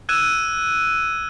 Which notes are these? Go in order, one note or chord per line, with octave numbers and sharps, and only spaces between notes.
E6 F#6 G#6 D#7 E7